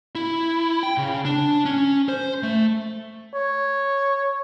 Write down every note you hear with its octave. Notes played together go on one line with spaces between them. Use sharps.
E4
G5
C#3
D4
C#4
C5
A3
C#5